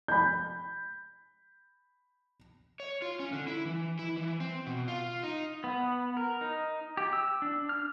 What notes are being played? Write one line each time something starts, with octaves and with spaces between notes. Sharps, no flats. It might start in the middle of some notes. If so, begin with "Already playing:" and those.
B5 G6
C#5
F4
C#4
D3
E4
E3
E4
E3
C4
B2
F4
D#4
B3
A#4
D#4
G4
E6
D4
F6